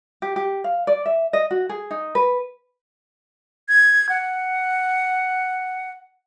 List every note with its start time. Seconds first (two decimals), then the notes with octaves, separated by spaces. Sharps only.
0.22 G4
0.36 G4
0.64 F5
0.87 D5
1.06 E5
1.33 D#5
1.51 F#4
1.69 G#4
1.91 D#4
2.15 B4
3.69 G#6
4.09 F#5